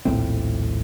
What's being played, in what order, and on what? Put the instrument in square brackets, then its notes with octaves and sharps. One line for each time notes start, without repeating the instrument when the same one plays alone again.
[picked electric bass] D#1 A#1 A2 C4